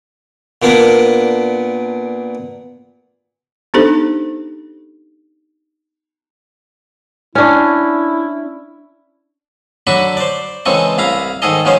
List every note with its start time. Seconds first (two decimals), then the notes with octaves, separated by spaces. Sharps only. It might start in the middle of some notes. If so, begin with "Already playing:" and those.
0.62 A#2 B3 D4 A#4
3.74 B3 D4 D#4 G4 A4 C5
7.35 C#4 D4 E4
9.87 D3 F#3 D4 F#4 B5 C#6
10.17 C5 D5
10.66 C#3 E3 G#3 C4 A4 C#6
10.98 C2 E4 F5 A#5
11.42 G#2 D#3 G#4 A4 D#5
11.65 B2 F3 G#3 C#4 C5 C#5